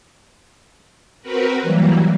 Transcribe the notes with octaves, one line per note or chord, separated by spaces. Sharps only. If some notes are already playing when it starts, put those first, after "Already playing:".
C4 F#4 A#4 B4
E3 F#3 G3 A#3